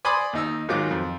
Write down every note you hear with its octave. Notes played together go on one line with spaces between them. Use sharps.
D5 G#5 B5 C6 D6 D#6
D#2 D#4 E6
G#2 D#3 F#3 F4 D6
F2